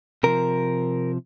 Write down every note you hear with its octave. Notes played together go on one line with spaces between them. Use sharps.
C3 F3 A#4